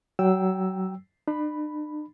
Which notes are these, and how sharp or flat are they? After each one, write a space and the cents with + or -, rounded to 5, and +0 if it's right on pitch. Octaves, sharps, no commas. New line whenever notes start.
F#3 +25 G5 +0 E6 +0
D4 +45 B5 +0